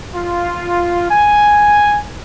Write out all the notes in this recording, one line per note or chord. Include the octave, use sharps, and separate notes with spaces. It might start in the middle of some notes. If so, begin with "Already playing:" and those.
F4
G#5